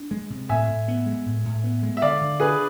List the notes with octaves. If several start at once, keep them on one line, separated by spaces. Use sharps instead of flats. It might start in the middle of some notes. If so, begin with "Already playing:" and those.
Already playing: D4
G#3
C3
A2 E5 G#5
A2
B3
G#3
A2
A2
B3
G#3
E5
D3 D5 F5
D3
D4 G#4 B4